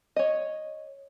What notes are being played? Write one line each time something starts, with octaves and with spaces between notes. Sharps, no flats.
C#5 D#5